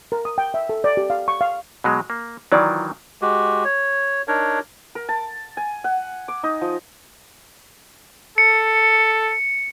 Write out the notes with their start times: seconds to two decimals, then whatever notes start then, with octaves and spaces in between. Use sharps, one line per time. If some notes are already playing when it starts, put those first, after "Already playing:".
0.12 A#4
0.25 D#6
0.38 G5
0.54 E5
0.69 A4
0.84 D5
0.97 G4
1.10 F5
1.28 C#6
1.41 F5
1.84 B2 F#3 G#3
2.10 A#3
2.52 D#3 E3 F#3 E4 F4 D5
3.22 G#3 F#4 G4
3.65 C#5
4.28 D4 D#4 A#4 C#5
4.95 A#4
5.09 A5
5.57 G#5
5.84 F#5
6.28 D6
6.43 D#4
6.61 F3
8.38 A4 C#7